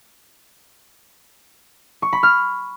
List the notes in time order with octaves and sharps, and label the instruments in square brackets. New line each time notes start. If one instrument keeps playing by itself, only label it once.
[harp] C#6
B5
F6